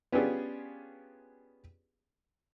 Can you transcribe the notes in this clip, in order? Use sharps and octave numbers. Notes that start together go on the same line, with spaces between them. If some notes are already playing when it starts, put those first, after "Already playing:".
B3 C#4 D4 F4 G4 G#4